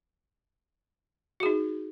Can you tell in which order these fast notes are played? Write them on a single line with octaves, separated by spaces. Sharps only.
F#4 G#4 D#4